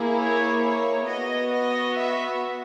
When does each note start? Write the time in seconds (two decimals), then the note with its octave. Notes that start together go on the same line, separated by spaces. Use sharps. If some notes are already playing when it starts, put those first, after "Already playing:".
Already playing: A#3 E4 G#4
0.19 C#5
0.64 C#5
1.08 B3 F#4 D#5
1.53 D#5
1.98 E5